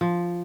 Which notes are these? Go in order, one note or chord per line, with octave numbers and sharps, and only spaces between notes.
F3